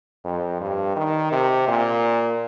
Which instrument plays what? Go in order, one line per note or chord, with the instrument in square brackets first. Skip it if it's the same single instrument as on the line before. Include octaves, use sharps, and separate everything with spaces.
[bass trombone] F2
G2
D#3
C3
A#2